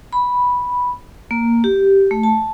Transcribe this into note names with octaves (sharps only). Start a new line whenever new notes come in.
B5
A#3
G4
A3
A5